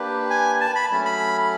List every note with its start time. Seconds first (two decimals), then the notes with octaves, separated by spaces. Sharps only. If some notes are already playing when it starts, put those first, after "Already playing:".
Already playing: A#3 D4 G4 B4
0.30 G#5
0.61 A5
0.75 B5
0.91 F#3 A3 C#4
1.05 B5